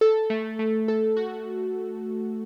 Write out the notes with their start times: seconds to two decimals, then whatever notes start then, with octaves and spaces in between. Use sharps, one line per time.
0.01 A4
0.30 A3
0.59 A3
0.88 A4
1.16 F#4